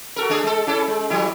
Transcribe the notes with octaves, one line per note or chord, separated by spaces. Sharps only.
F#4 A4 A#4
A3 D4 G#4
G#3 A4
C#4 E4 A4
G#3
F3 G3 E4